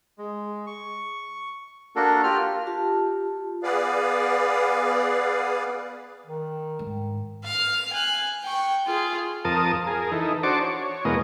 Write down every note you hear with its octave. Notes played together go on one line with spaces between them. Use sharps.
G#3
C#6
A#3 D4 F#4 A4 A#4
F4 G4 F6
F4 G4 A5
B3 G#4 B4 D5 F5
D#3
G#2
F5 F6
G#5 F#6
G5 C#6
F4 G#4
F2 A#4 A5 D#6
G#4 A#4
E3 D#4 A4
D4 F#4 C5 A5 C#6 D6
C#5
E2 B2 G#3 A#3 D#5